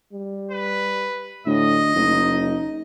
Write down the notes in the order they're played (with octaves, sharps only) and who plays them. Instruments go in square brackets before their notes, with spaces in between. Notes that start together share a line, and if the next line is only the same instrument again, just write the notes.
[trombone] G3
[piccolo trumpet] B4
[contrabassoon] D2 [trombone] A2 [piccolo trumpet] D#5
[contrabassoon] F#1 [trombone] D#4